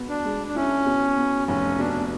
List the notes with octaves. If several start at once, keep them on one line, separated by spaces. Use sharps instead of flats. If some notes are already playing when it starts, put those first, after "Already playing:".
Already playing: B2 B3
D4
G#3
D4
C#4 E4
B2
B3
F1 C#4
B2 D4